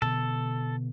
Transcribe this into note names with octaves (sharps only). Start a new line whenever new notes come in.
B2 D3 E3 A4